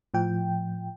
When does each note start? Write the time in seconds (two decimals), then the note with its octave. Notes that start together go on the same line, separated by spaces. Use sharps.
0.14 A2 F3 G5